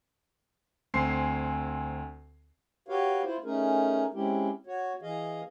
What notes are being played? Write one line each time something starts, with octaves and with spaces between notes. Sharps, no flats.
D2 C4 G#5 C6 C7
F#4 G4 B4 C#5 F5
E4 F4 C5
A3 C#4 D#4 G#4 A#4
G#3 C4 C#4 E4 G4
F#4 C#5
E3 G#4 D#5 F5